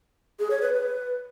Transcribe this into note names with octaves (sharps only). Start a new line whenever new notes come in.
G#4
C#5
B4
B4